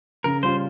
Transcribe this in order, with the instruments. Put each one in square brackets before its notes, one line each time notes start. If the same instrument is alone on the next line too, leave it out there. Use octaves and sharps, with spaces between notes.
[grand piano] C#3 [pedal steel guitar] A#4
[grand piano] G3 C#4 F4 [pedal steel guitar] C5